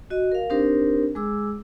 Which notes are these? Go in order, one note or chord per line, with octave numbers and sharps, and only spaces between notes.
F#4 D#5
A#4 F5
C4 D4 D#4 G4 A#4 C5
G#3 G#4 D6 E6